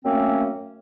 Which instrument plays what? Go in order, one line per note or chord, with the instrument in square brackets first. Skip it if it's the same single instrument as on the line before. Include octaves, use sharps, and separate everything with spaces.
[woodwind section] F#2 A3 A#3 C4 C#4